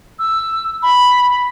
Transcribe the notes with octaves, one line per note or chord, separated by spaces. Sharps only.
E6
B5